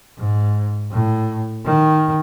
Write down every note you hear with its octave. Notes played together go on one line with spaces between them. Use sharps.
G#2
A2
D#3